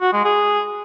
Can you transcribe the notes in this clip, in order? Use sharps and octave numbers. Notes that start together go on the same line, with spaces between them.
F#4
G#3
G#4